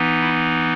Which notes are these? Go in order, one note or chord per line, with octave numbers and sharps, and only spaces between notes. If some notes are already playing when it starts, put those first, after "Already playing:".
Already playing: E3 B3 D#4
E4